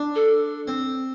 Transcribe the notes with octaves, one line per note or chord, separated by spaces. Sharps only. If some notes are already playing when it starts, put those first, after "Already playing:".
Already playing: D4
A4
C4